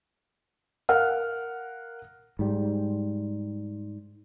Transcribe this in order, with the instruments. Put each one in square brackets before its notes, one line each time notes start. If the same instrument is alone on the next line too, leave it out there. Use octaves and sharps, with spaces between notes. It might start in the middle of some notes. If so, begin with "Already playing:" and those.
[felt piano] A#4 F5 F#5 F6
[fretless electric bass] G#2 G3